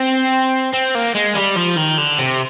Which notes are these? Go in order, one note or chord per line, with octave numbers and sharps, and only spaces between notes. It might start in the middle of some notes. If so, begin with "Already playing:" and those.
Already playing: C4
C4
A#3
G#3
G3
F3
D#3
D3
C3